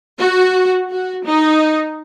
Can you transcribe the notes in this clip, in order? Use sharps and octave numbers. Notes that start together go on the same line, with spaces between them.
F#4
F#4
D#4